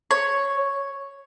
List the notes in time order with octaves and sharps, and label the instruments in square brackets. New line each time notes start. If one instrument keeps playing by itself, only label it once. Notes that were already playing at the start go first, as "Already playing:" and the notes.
[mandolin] C#5